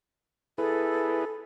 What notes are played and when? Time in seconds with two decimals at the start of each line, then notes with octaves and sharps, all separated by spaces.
0.58 E4 G#4 A4 B4